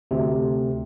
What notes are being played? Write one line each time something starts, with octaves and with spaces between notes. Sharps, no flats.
D2 C3